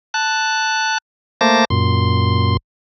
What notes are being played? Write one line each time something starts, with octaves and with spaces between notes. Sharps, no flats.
A5 F#6
A3 A#3 C5 A5 D6 A#6
F#2 A#2 C6